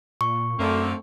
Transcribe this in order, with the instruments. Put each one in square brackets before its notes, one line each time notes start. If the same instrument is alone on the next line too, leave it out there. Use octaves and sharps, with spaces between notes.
[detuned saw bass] A#2 [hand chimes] C#6
[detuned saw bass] F#2 [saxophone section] D3 A#3 [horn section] A3 C4